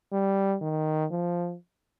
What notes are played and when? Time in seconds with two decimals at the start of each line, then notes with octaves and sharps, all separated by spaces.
0.12 G3
0.61 D#3
1.10 F3